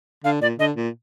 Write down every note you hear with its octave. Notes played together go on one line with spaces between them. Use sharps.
D3 F5
A#2 D5
D3 D#5
A#2